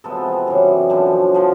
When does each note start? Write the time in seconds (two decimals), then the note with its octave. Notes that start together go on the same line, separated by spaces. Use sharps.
0.04 C3 F3 G#3 B3 A4 B4
0.47 F#2 C#3 E3 G3
0.90 F#2 D3 F3
1.34 D3 F3